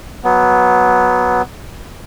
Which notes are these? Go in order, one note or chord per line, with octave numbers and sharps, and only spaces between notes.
F#3 B3